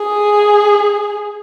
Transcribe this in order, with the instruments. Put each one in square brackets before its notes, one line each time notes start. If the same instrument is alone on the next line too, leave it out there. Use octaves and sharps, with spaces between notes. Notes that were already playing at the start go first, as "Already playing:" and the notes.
Already playing: [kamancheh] G#4